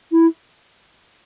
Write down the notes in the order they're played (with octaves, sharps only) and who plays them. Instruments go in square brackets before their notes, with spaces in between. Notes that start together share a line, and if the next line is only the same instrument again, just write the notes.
[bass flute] E4